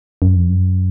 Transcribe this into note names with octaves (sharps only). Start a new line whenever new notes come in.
F#2
F2
F#2